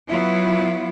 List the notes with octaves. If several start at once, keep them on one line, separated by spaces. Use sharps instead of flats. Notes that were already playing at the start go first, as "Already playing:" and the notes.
F#3 B3 E4 F4